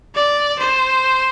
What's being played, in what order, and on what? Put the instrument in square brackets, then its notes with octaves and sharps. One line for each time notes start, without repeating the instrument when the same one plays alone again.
[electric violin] D5
C5